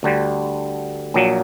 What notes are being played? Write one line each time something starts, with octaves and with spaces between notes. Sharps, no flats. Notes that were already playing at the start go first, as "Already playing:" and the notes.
D2 D3 G3
A#1 A#2 F#3